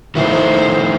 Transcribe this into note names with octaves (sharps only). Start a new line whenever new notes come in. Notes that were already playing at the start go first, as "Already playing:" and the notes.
D#3 A3 E4 C5